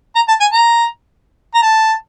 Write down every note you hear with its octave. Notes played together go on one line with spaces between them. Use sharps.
A#5
A5
G#5
A#5
A#5
A5